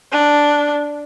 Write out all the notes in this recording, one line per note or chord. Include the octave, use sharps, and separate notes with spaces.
D4